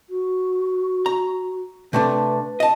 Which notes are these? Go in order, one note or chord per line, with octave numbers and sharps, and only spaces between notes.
F#4
A#5
C3 A3 D4 B4
D#5 A5